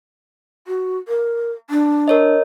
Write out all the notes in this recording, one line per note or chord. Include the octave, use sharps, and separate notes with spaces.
F#4
A#4
D4
A#4 C#5 D#5